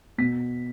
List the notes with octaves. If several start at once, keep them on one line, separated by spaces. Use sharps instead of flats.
B2 B6